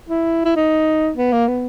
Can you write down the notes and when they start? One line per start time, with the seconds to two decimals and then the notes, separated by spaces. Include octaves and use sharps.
0.09 E4
0.44 E4
0.56 D#4
1.17 B3
1.32 A#3
1.48 B3